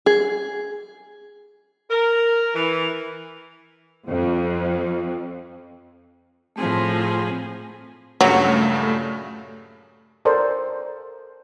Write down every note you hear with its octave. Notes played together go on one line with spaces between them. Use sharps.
G#4
A#4
E3
F2
A2 F3 A3 C4 G#4 C6
G2 A#2 C#3 F#3 A3
A4 A#4 C5 D5